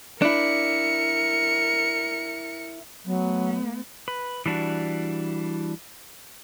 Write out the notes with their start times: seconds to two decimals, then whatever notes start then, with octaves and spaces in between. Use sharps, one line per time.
0.22 D4 E4 A#4 C#7
3.06 F#3 A3 B3
4.08 B4
4.46 E3 G3 D4 F#4